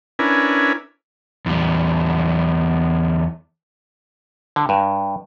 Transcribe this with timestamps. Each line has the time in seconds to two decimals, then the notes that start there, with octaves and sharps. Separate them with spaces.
0.19 C#4 D4 E4 A#4 B4 G#5
1.46 E2 G3
4.56 D3
4.69 G2